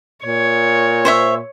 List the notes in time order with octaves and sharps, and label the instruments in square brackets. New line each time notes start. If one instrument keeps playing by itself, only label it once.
[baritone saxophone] A#2 [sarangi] C#5
[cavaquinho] C5 C#5 E5